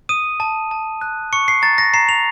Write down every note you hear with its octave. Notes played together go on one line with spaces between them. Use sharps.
D#6 D#7
A5
A5
F#6
C#6 C#7
C7
A#5 A6
A#6
A#5 C7
F7